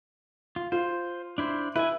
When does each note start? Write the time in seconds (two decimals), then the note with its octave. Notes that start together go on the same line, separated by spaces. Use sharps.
0.56 F4
0.72 F4 C5
1.38 D4 E4 C5
1.76 E4 B4 G#5